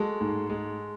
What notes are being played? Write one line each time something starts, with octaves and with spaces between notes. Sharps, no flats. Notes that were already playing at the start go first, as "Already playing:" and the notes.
Already playing: G#3 F#4 A4
G#2
G#3